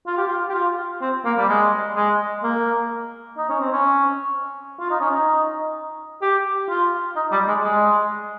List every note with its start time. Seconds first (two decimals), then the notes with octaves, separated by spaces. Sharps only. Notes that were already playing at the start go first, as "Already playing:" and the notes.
0.07 F4
0.17 G4
0.28 F4
0.50 G4
0.54 F4
1.02 C4
1.25 A#3
1.38 G3
1.49 G#3
1.96 G#3
2.43 A#3
3.38 D#4
3.49 C#4
3.60 C4
3.72 C#4
4.80 F4
4.90 D#4
5.01 C#4
5.11 D#4
6.22 G4
6.69 F4
7.16 D#4
7.32 G3
7.48 G#3
7.63 G#3